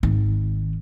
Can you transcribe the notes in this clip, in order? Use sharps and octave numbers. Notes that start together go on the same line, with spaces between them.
G#1 D#3